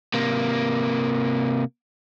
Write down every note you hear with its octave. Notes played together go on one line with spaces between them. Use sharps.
C3 A#3